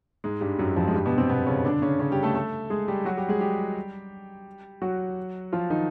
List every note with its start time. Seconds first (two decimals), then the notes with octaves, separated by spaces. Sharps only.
0.24 G#2 G#3
0.41 G2 G3
0.58 F#2 F#3
0.76 F2 F3
0.88 G#3
0.94 G2 G3
1.05 B2 B3
1.18 C3 C4
1.29 B2 B3
1.46 C#3 C#4
1.64 D3 D4
1.82 C#3 C#4
2.00 C#3 C#4
2.11 G3 G4
2.23 A3 A4
2.35 A3 A4
2.70 G#3 G#4
2.88 G3 G4
3.05 F#3 F#4
3.17 G3 G4
3.28 G#3 G#4
3.41 G3 G4
4.82 F#3 F#4
5.53 F3 F4
5.70 D#3 D#4